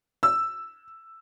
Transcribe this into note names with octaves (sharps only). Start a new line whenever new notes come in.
E6